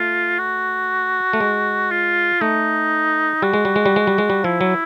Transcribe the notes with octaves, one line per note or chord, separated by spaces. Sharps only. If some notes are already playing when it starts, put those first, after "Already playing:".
Already playing: A3 F4
F#4
A3
G#3
F4
A3 D#4
G3 F#4
G#3
G3
G#3
G3
G#3
G3
G#3
G3
F3 E4
F#3